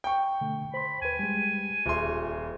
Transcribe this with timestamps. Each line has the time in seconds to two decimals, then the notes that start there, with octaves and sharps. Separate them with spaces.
0.04 G5 C#6
0.41 B2 D3 A3
0.74 C5 B5 C6
1.02 D#2 B4 G#5
1.19 G3 G#3
1.86 D#1 F4 G#4 E5 C6